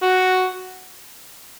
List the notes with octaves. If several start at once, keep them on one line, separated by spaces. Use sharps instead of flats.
F#4